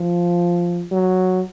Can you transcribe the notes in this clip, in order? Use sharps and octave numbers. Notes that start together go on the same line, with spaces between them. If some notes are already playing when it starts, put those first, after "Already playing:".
Already playing: F3
F#3